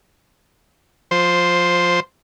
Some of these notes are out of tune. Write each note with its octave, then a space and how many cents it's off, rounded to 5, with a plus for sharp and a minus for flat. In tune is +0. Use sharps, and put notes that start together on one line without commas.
F3 +15 C5 +0